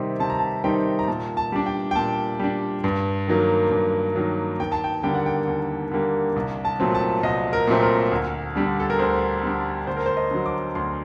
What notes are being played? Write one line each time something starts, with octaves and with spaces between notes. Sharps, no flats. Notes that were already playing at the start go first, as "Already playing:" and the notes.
Already playing: C3 D#3 G3 C4 D#4
C3 A5
A#5
A5
D#3 G3 C4 D#4 G5
A#5
A#2 A5
A5
G3 D4
G5
G5
A#2 A5
G3 D4
G2
D#3 F#3 A#3
G2
D#3 F#3 A#3
D#2 G5
A5
G5
D3 G3 A#3 G5
F#5
G5
D#2
D3 G3 A#3
C2
A5
A#2 F#3 A3 C4
A5
C2 D#5
A#4
A#2 F#3 A3 C4
A#4
D2
D3 G3 D4
A4
A#4
D2 C5
D3 G3 D4
D2 C5
A#4
C5
D#5
D3 F#3
D6
D2 C6